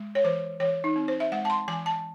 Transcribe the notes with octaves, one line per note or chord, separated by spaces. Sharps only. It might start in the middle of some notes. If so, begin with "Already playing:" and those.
Already playing: G#3
C#5
E3 C5
E3 C#5
D#4
C4
C5
E5
G#3 F#5
A5
C6
E3 G#5
A5